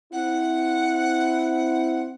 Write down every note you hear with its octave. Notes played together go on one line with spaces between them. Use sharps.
C4 E4 F#5